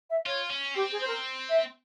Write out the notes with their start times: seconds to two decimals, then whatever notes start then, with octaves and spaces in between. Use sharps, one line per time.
0.10 E5
0.26 F4 C#5
0.50 C#4
0.75 C4 G4
0.92 G#4
1.00 C5
1.07 A#4
1.49 E5